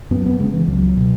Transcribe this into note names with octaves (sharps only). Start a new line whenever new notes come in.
F#2 B3
B3
C#3 G#3
E3
C#2 F#3
B2